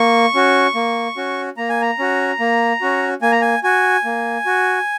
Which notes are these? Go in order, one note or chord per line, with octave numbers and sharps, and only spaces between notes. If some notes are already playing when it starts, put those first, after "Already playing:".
Already playing: A#3 C#6
C#4 F#4
A#3
C#4 F#4
A#3 A#5
G#5
A#5
C#4 F#4
A#3
C#4 F#4
A#3 G#5
A#5
G#5
F#4 G#5
A#3
F#4